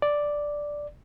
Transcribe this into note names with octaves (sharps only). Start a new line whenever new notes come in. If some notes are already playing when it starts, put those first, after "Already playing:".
D5